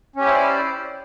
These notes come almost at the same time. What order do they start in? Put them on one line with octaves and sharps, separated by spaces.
C#4 G4 E4 C5 D5